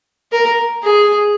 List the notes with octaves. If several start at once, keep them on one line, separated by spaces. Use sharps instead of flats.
A#4
G#4